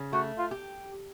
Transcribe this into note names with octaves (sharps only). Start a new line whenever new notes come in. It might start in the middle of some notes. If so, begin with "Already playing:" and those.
Already playing: C#3
A3 F#4
F4
G4